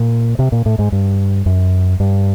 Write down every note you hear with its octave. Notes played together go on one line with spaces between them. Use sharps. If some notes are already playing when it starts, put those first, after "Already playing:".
Already playing: A#2
C3
A#2
A2
G#2
G2
F#2
G2